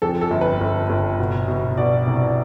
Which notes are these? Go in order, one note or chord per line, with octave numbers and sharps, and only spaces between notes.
F2 A4
A4
G1
B4
G1
G1
B2
B2
B2 D5
C2